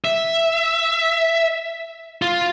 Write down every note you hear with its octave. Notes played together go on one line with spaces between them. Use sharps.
E5
F4